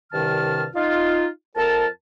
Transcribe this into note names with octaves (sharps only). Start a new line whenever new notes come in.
C2 G2 C3 D#3 A5 F6
D#4 F4
F2 A#4 A5